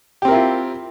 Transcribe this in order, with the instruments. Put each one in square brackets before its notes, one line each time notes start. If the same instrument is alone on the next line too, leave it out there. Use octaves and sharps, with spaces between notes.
[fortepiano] G4
C4
A#4
E4
F4